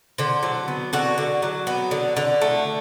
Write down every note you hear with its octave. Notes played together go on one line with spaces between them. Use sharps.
D3 C5
F#3
B3
D3 F#4
D3
F#3
B3
D3
D3
A3